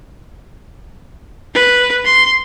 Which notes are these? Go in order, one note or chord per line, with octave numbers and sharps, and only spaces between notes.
B4
C6